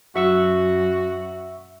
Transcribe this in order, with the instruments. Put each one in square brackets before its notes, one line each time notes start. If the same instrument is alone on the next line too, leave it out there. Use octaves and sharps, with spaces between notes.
[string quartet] F#2 [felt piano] F#3 [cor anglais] F#4 [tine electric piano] E5 C#6 E6